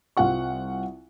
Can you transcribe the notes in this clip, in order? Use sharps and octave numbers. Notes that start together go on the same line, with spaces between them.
C2 C4 F4 F#5 C#6